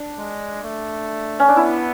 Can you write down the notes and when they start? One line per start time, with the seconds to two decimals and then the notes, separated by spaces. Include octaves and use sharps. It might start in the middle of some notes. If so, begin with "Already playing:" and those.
Already playing: D4
0.18 G#3
0.64 A3
1.39 C#4
1.48 D4
1.56 B3 E4